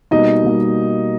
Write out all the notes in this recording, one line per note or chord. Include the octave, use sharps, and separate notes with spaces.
B2 G3 A#3 D#4 D#5
B2 G3 A#3